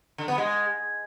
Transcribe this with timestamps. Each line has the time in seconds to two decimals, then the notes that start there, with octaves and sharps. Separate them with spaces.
0.18 D3
0.28 B3
0.38 G#3